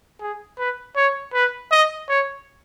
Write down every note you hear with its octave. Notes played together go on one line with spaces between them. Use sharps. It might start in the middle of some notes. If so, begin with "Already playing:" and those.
G#4
B4
C#5
B4
D#5
C#5